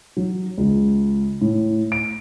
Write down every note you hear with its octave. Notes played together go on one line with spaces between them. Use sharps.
F#3
C#2
A2
D7